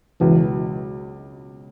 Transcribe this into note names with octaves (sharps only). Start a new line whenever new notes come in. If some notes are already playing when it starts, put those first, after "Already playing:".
C#2 B2 E3 F#3